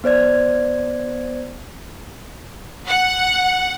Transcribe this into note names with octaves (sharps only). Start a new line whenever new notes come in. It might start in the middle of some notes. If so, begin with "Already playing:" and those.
B3 C5 D5 G#6
F#5